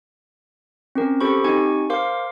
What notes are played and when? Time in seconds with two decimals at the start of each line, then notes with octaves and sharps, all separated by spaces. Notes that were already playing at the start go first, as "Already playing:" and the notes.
0.95 C4 C#4 A#4
1.21 G4 A4 C5 B5 C#6
1.44 C4 D#4 G4 G#5 C#6 G#6
1.90 A#4 C5 F5 C6 D6